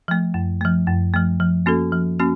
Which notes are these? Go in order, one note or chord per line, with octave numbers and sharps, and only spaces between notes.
F3 A3
F#2
F3 A3
F#2
F3 A3
F3
A#3 C#4 F#4 A4
F3
A#3 C#4 F#4